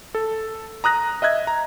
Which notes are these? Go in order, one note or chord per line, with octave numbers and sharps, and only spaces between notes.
A4
A#5 D#6 F#6 A#6
D#5 E5 F#6 G#6
A#5